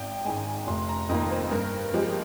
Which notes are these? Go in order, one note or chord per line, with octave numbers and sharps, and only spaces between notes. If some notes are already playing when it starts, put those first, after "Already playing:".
Already playing: G#1 G5
G#2 D#3 G#3 G#5
F1 C6
A#5
F2 D#3 A#3 D#5
C5
G2 A#4
F3 G#3 G4